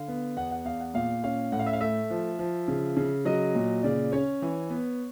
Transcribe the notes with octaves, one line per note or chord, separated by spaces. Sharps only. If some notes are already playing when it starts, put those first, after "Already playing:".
Already playing: D3 F5
B3
E2 F#5
F#5
E2 F5
F#5
A#2 F5
C#4 F5
A2 F#5
F5
E5
F5
A3 E5
F3
F3
C#3
C#3
F#3 D#5
A#2
C#3 D5
C#4 C#5
E3
B3